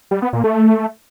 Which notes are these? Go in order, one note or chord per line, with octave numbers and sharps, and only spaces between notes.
G3
B3
A#2
A3